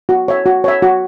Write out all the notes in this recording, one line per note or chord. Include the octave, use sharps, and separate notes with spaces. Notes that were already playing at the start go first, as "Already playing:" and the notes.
F#4
C#5 E5
F#4
C#5 E5
F#4